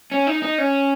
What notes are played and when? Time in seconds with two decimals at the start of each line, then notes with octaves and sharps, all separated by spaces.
0.12 C#4
0.27 D#4
0.42 D#4
0.58 C#4